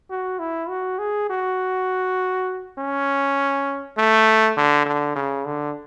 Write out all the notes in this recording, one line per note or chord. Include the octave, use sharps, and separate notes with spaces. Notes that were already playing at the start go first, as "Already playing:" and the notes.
F#4
E4
F#4
G#4
F#4
C#4
A3
D3
D3
C#3
D3